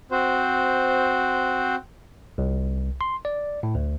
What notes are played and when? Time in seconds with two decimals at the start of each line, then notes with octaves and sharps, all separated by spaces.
0.11 C4 F#4 C5
2.38 C2
3.01 C6
3.25 D5
3.63 A2
3.75 D2